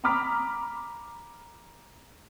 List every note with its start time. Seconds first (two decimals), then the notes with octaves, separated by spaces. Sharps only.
0.04 A#5 B5 D6 F6 B6